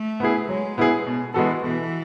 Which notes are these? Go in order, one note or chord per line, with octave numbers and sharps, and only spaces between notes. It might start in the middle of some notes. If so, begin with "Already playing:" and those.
Already playing: A3
B3 E4 G#4
F#3 G#3
B3 E4 G#4
B2
E3 G#3 B3 F#4 A4
B2 E3